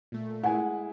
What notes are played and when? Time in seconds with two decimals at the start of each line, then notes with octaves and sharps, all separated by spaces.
0.12 A#2 A3
0.43 G#3 E4 F#5 G#5